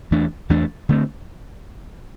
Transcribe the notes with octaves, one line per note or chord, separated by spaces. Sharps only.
E2 E3 A3 D4
E2 E3 A3 D4
D3 A3 C4